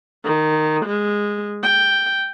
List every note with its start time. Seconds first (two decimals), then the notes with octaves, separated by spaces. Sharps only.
0.24 D#3
0.85 G#3
1.63 G5